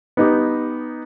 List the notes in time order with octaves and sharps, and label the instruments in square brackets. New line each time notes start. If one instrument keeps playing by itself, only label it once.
[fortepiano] B3 D#4 G4